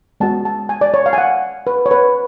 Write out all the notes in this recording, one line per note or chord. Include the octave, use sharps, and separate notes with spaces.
G#3 B3 F#4 A5
A5
G#5
D5
C#5
F5
G#5
F#5
B4
C#5
B4